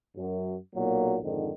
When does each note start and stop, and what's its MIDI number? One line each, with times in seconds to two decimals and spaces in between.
0.16 0.55 42
0.75 1.16 35
0.75 1.16 46
0.75 1.16 54
0.75 1.16 58
1.22 1.51 41
1.22 1.51 44
1.22 1.51 50
1.22 1.51 51